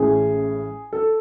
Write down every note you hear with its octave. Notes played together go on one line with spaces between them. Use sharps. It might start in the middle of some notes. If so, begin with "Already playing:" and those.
Already playing: A1 A2 G#3 C#4 G#4
A4